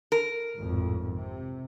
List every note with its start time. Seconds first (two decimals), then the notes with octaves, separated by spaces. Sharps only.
0.12 A#4
0.56 G#1 F2 A2
1.12 C3